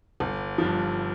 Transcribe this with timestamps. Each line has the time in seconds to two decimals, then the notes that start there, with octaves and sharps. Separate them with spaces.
0.20 G1
0.58 G2 F3